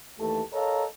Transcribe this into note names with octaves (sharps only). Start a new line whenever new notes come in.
D#2 E3 A3 G4 A4 A5
A4 A#4 C#5 D#5 F5 A#5